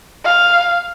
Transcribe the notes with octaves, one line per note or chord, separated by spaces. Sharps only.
F5